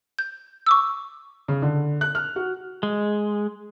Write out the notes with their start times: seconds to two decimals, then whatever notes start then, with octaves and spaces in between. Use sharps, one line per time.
0.19 G6
0.66 C#6 D6 E6
1.48 C#3
1.62 D3
2.01 F#6
2.15 F6
2.36 F#4
2.83 G#3